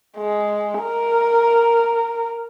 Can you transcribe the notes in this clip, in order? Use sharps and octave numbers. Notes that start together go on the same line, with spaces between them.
G#3
A#4